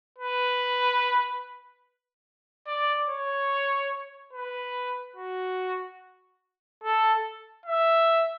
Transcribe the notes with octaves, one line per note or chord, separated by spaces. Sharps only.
B4
D5
C#5
B4
F#4
A4
E5